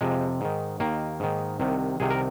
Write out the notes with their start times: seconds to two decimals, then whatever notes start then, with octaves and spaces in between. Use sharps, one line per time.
0.01 F2 C3 F3 G#3
0.41 G#2 D#3
0.80 D#2 D#3 A#3
1.20 G#2 D#3
1.60 C2 C3 D#3
2.00 C2 C3 D#3 G#4
2.10 A#4